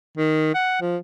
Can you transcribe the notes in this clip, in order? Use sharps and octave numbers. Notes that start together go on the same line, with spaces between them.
D#3
F#5
F3